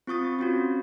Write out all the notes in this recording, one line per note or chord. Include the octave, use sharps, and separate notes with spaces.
C4 F4 C#6 D#6 A6
C4 C#4 F4 F#4